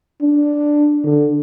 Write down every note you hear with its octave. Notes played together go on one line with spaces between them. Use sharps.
D4
D3